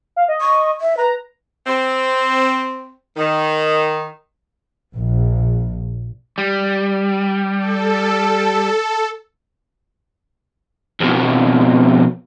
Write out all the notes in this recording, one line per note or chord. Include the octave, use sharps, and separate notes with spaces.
F5
D#5
C#6
E5
B4 A#5
C4
D#3
A#1
G3
A4
F2 B2